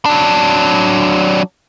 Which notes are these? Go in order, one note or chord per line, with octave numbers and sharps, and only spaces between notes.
F#3 D4